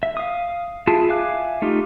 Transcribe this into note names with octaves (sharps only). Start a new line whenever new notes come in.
E5
F5 D#6
E4 F4 G#4 A5
E5 F5 G#5 D6 F#6
A3 D#4 F4 G4